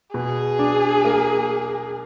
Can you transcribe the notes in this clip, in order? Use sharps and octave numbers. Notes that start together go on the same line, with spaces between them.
B2 G#4
D4
A#3